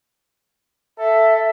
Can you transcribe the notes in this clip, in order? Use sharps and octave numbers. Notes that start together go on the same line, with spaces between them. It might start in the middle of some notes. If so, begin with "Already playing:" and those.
A4 E5